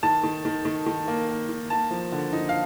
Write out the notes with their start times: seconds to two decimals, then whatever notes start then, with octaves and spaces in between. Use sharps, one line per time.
0.03 D#3 A5
0.23 D#3
0.45 D#3
0.65 D#3
0.86 D#3
1.08 A#3
1.29 A#3
1.49 D#3
1.70 A#3 A5
1.91 F3
2.12 D3
2.33 D#4
2.49 F5